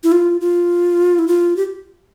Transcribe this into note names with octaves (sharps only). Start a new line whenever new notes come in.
E4
F4
F4
E4
F4
G4